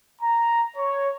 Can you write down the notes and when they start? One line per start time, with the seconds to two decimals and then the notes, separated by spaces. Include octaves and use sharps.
0.21 A#5
0.76 C#5